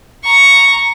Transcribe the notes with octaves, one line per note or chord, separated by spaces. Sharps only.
A#5 C#6